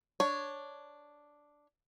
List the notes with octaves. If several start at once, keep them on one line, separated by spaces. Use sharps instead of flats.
D4 C#5